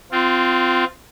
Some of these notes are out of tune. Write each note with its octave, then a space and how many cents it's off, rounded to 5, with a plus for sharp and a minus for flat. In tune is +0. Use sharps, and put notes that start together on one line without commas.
C4 -20 F4 +0